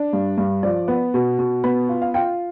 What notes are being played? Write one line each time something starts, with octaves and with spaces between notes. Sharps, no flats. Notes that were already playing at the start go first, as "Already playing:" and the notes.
Already playing: D4
G2
G2
F3 D5
B3
B2
B2
B3 B5
F4
F5
F4 G5